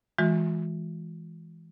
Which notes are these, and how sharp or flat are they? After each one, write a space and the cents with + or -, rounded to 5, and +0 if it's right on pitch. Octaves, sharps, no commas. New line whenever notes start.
E3 +0 G#3 +10 F#4 -45